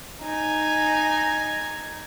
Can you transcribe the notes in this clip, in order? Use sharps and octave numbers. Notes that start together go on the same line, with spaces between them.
D#4 G#5